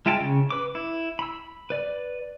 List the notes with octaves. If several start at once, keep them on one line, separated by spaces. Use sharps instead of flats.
G#3 F4 E5 G5 A5
C#3
B4 D6
E4
B5 E6
B4 D5